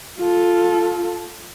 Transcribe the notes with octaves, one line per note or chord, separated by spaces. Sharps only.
F4 A4